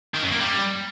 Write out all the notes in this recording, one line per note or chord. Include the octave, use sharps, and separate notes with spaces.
D#3
F#2
A#3
G3